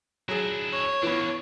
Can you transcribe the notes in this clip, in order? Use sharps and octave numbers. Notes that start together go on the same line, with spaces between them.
F#3 D4 E4 G#4
C#5
E3 A#3 B3 D4